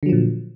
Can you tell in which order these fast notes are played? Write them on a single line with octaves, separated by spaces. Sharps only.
D3 F#3 F3 A#2